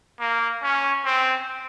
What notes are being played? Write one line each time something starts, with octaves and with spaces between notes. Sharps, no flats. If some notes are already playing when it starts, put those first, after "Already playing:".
A#3
C#4
C4